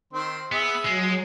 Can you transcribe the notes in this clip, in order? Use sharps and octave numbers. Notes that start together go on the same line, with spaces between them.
D#3 C4 C6
B3 G#4 E5
F#3 G#3